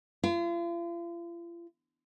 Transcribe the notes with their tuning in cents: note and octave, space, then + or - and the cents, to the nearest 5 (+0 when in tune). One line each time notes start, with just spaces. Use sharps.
F4 -40